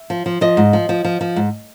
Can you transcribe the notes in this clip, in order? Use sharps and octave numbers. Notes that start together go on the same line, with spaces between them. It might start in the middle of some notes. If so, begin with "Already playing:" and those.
Already playing: E5
F3
F3
F3 D#5
G#2
F3
F3
F3
F3
G#2